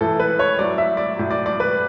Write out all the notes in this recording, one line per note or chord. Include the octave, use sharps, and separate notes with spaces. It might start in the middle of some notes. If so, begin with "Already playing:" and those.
A2 E3 A4
B4
C#5
A2 F#3 D5
E5
D5
A2 F#3
D5
D5
B4